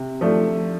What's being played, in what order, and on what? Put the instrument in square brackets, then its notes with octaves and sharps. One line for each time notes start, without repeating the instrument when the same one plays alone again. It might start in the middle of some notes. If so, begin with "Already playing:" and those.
Already playing: [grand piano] C3
F3 A3 D4